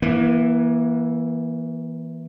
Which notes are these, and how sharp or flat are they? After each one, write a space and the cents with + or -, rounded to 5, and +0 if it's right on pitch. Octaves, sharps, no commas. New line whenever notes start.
E3 +0 A#3 +35